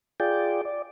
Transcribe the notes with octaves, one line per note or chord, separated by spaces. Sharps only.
F4 G#4 D5 G5
D5